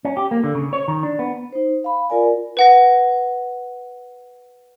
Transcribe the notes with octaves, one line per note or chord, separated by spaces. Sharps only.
C#4
G4
A#3
D3
C#3
C#5
D#3
D4
B3
D#4 C5
F5 B5
F4 A#4 D5 G#5
B4 F#5 A#6